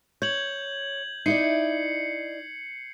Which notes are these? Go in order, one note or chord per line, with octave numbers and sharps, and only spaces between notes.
C#5 G6 G#6 F#7
D#4 E4 D5 C7 C#7